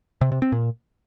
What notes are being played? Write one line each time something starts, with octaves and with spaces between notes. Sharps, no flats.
C3
C3
C4
A#2